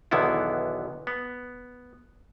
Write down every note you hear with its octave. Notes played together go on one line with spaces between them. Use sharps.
B1 E2 D3 D#3 B3 E4
B3